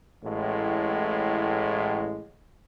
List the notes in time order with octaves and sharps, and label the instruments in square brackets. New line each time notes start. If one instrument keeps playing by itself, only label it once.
[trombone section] A1 A2 G#3